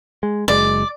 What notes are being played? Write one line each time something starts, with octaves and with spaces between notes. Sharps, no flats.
G#3
F#1 G#3 D5